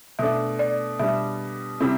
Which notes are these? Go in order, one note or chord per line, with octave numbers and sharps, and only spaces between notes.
B2 A3 D4 E5
D5
B2 G3 D4 E5
C3 G3 C4 E4